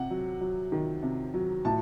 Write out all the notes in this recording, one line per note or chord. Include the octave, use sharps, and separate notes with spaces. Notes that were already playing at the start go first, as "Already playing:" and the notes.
Already playing: C3 F#5
F#3
F#3
D#3
C3
F#3
A2 A5